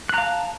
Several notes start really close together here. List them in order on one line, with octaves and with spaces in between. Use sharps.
F#6 A#5 F5 A5